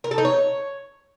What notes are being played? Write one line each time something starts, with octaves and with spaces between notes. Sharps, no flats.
A#4
A4
D#4
C#5